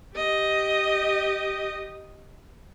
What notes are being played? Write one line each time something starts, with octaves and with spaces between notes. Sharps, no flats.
G4 D#5